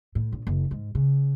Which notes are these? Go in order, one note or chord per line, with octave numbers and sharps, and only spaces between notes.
A2
A#1
F#1
G#2
C#3